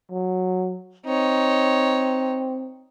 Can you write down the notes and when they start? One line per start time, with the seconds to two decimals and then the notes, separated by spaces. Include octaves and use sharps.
0.11 F#3
1.07 C4 D#4 C#5